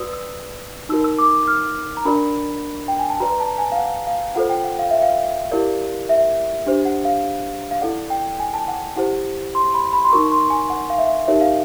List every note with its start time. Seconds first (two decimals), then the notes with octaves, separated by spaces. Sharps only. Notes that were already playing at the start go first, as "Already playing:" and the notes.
Already playing: F#4 B4 D5 D#6 E6
0.13 E6
0.89 D#4 F#4 A#4 E6
1.04 E6
1.19 D6
1.48 F6
1.97 A#5
2.05 D4 F#4 A#4 D5 B5
2.88 G5
2.99 G#5
3.10 A5
3.20 F#4 B4 D5 A#5
3.40 A5
3.58 G#5
3.72 F5
3.78 F#5
4.07 F5
4.35 F4 A4 C5 F#5
4.50 G5
4.64 F#5
4.79 F5
4.91 E5
5.02 F5
5.51 E4 G4 A#4 D5
6.09 E5
6.66 D4 G4 C5
6.85 F#5
7.05 F5
7.71 F5
7.81 E4 A4 D5 F#5
8.10 G5
8.40 G#5
8.54 A5
8.68 F#5
8.96 E4 G4 C5 F#5
9.55 C6
9.74 B5
9.93 B5
10.04 C6
10.12 D#4 F#4 A#4 C#6
10.32 C6
10.50 G#5
10.70 F#5
10.90 F5
10.98 E5
11.27 D#4 G4 A#4 C#5 E5
11.41 F5